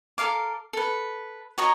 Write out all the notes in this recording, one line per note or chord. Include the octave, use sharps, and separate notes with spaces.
A4 A#4 F5 D6
A4 B4
F#4 C#5 D#5 A#5